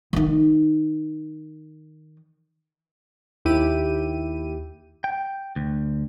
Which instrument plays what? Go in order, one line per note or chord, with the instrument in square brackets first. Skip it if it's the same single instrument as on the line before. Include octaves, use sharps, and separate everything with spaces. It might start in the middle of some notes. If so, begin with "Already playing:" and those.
[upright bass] D#3 D#4
[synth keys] D#2 E4 G4 D#7
[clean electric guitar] G5
D2